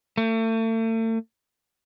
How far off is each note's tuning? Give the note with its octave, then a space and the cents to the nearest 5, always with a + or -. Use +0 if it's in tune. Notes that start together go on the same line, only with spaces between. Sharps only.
A3 +40